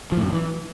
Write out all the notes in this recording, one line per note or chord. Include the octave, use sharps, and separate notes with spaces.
F3
A2
F#2
D#3
E3